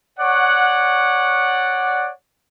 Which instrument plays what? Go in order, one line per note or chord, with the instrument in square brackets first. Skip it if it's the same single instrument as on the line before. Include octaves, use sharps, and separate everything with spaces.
[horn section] C#5 D5 F#5